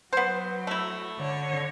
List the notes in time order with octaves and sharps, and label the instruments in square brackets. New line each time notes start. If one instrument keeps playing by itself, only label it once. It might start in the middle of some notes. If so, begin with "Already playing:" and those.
[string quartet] F#3 [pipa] B3 C5
[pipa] A3 E4
[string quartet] D3 C#5